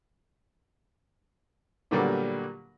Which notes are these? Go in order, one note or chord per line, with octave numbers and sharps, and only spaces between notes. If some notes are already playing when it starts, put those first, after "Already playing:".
A#2 D3 F#3 G3 A#3 B3